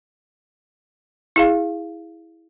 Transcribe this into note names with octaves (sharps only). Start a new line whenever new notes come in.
E4 G#4 F5